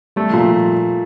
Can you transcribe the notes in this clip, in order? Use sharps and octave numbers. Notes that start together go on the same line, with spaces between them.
G3 A3
A#2 F3